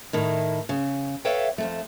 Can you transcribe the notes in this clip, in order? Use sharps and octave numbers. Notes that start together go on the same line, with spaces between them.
A2 D#3 E4
C#3
A4 B4 C#5 E5 F5 G5
F2 G#2 A3